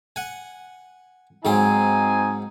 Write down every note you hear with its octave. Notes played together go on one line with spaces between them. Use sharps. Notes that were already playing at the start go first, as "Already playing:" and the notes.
F#5 G#5
G#2 F#3 C4 D#4 G#5 C6